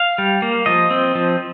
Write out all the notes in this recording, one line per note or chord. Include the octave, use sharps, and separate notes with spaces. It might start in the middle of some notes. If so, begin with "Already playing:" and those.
Already playing: F5
G3
A#3
F3 D#5
C4
F3